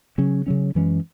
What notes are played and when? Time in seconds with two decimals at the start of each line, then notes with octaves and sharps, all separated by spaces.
0.18 C#3 F#3 C#4
0.46 C#3 F#3 C#4
0.75 F#2 E3 G#3 C#4